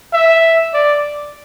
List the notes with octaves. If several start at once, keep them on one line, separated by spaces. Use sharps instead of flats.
E5
D5